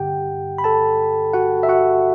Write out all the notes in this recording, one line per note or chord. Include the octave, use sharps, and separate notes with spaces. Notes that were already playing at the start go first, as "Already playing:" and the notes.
Already playing: G2 D3 G4 F#5 G5
B5
A4 A5
F#4 F#5
E5
F#4 F#5